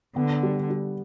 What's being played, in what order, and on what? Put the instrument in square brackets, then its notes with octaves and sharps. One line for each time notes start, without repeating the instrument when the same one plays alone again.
[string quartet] D3 [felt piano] B3
[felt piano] G3
G3